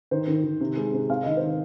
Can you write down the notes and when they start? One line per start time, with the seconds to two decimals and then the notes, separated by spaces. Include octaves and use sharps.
0.11 D#3 C5
0.27 D#3
0.44 D#3
0.61 C3
0.77 G#3
0.93 C3
1.09 C4 F5
1.24 D#3 D#5
1.37 D#3 C5